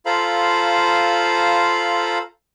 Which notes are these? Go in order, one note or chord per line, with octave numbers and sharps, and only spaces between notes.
F4 A4 C5 F5 A#5 B5